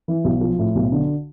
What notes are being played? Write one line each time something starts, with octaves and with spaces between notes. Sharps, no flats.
E3
B1
F3
A2
B1
D3